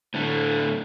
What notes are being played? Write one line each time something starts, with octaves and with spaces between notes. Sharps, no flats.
A2 D3 A3